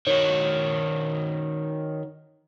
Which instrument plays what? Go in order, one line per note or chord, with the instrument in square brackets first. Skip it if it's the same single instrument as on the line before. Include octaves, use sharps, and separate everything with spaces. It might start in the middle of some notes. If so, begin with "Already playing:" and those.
[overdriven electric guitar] D#3 F#4 [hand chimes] C#5